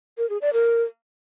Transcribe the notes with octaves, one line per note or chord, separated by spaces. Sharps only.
A#4
G#4
D5
A#4